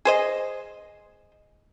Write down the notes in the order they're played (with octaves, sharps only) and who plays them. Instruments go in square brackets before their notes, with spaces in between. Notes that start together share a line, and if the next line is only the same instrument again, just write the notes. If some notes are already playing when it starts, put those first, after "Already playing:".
[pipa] G#4 C5 D#5